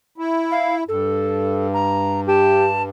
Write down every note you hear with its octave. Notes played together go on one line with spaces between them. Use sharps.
E4
F5
G2 A4
A#5
G4 A5